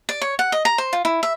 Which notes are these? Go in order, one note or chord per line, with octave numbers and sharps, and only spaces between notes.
D5
C#5
F#5
D#5
A#5
C5
F4
E4
E5